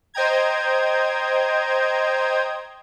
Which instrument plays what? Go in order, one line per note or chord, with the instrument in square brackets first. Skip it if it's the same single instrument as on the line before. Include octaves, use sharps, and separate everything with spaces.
[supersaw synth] C5 D#5 G5 A#5 G#6